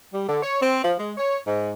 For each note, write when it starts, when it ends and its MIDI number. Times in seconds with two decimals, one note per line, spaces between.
0.14 0.25 55
0.27 0.40 50
0.43 0.61 73
0.61 0.81 60
0.83 0.92 53
0.98 1.12 56
1.17 1.38 73
1.47 1.71 44